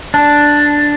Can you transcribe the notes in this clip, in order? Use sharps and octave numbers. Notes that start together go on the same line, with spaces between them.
D4